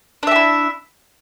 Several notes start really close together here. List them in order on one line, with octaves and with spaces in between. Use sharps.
D4 E5 G4 E4